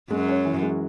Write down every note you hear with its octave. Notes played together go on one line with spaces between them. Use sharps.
F#2 F#3 G#3
C#4
E3
G#3